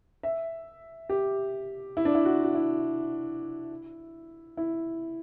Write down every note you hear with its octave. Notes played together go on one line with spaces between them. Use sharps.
E5
G4
E4
D4
E4
F#4
F#4
E4
E4